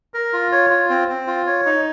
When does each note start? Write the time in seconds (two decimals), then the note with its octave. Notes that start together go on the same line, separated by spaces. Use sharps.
0.14 A#4
0.33 F4
0.52 C#5
0.70 F4
0.90 C4
1.08 C4
1.27 F4
1.47 C#5
1.66 D#4